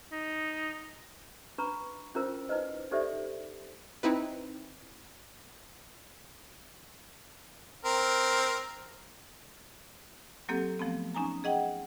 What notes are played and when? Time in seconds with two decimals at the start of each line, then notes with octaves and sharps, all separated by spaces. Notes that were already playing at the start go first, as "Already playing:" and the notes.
0.12 D#4
1.58 D4 B4 A#5 B5 C#6
2.15 C#4 D4 E4 F4 A#4 C5
2.49 D#4 E4 B4 C5 D#5
2.91 D#4 G4 A4 C5 D5 E5
4.03 C4 D#4 E4 B4
7.85 C4 A#4
10.49 F#3 A#3 C4 G4 A4
10.79 F3 A3 B3 C4
11.15 C#4 D#4 G#5 A#5
11.44 G#4 D#5 F#5 G5